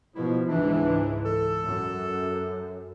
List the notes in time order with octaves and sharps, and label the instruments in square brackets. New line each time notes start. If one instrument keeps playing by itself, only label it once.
[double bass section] B2 F3 [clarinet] E4
[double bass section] C#2 G#2 E3 [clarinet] D4
[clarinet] A4
[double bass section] F#2